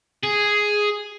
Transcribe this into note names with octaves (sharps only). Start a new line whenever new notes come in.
G#4